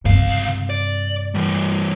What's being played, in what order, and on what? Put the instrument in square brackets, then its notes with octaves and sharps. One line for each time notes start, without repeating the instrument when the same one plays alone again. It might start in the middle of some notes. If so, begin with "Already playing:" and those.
[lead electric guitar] C#2 F5 [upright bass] G2 C3
[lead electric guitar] D5
E3 G3